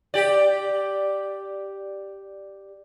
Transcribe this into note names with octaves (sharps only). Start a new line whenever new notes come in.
G4 D5